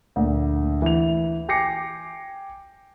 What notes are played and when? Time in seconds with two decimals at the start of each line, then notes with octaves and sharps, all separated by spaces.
0.16 D2 A#2
0.82 E3 F7
1.49 G5 G#5 D6 A#6 C7 C#7